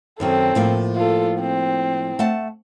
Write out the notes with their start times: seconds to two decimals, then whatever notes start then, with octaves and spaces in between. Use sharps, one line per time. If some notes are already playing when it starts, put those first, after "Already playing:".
0.20 F#2 D#3 F#3 C4 A4
0.55 A2 F3 A#3
0.96 F4 A4
1.40 C4
2.19 A3 F#5 A5